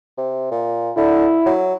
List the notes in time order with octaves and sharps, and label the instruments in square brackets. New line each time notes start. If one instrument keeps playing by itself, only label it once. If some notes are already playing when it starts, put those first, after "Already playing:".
[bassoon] C3
A#2
[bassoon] D3 [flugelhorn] E4
[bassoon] F#3